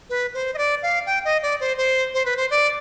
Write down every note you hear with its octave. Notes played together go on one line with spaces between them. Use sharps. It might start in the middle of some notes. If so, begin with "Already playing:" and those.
B4
C5
D#5
D5
F5
G5
D#5
D5
C5
C5
C5
B4
C5
D5